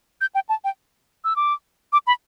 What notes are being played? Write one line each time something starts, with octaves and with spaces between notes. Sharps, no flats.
G6
G5
A5
G5
E6
D6
D6
B5